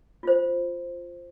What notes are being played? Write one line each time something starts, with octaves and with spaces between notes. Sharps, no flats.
F4 C5